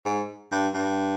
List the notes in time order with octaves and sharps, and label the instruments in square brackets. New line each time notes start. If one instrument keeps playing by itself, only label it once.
[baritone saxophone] G#2
G2
G2